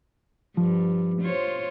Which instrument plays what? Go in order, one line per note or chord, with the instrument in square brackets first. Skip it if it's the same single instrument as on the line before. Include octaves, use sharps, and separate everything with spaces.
[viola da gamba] G2 [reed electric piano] F3
[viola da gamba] F4 C5 C#5